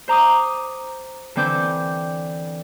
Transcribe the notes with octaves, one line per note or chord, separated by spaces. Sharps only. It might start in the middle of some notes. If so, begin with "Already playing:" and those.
C5 A#5 D6 D#6
D3 E3 C4 D6 G6